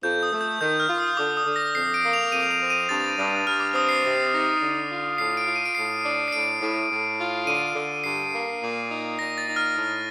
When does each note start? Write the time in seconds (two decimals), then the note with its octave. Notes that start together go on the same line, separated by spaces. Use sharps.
0.03 F2 G6
0.23 D#6
0.32 A3
0.41 G6
0.60 D#3 G6
0.80 F6
0.88 F4
0.98 D#6
1.17 D3 D6
1.37 D#6
1.46 D3
1.56 A#6
1.75 F2 C7
1.94 D7
2.03 A#3
2.13 F7
2.31 F2 D#7
2.51 F7
2.60 C4
2.70 D#7
2.89 G2 A6
3.18 G2
3.46 G2 F6
3.60 D6
3.74 C4 D#6
3.89 C7
4.03 C3
4.32 D#4
4.61 D3
4.90 F4
5.18 A2 C7
5.37 D7
5.46 F4
5.56 D#7
5.66 D7
5.75 A2 C7
6.03 D4
6.28 C7
6.32 A2 D7
6.61 A2
6.90 A2
7.18 F4
7.46 D3 D#7
7.75 D3
8.04 G2 C7
8.33 A#3
8.61 A#2
8.90 D#4
9.18 A#2 A#6
9.38 A6
9.47 D#4
9.56 F6
9.75 A2